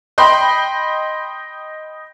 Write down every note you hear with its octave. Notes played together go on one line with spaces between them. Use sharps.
D#5 G5 B5 C6